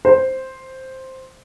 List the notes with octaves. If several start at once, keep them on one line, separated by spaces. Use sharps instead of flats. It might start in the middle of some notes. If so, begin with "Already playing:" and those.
C5